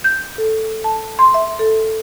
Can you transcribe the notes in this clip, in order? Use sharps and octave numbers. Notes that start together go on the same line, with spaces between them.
G6
A4
A5
C6
E5
A4